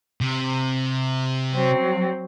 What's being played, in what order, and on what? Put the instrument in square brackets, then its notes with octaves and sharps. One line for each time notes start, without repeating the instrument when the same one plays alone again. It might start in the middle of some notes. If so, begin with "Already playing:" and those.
[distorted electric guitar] C3
[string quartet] F#3 C4